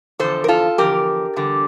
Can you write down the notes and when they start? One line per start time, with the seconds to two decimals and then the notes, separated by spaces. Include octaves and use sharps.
0.19 E2 D3 F3 A4 C5
0.44 A#4
0.48 F4 A4
0.78 E2 D3 F3 G4 A#4
1.36 E2 D3 G3